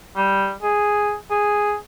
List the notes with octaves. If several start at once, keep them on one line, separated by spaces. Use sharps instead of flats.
G3
G#4
G#4